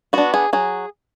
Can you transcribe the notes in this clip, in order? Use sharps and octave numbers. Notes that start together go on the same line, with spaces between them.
B3 D4 F#4
G#4
F#3 G#4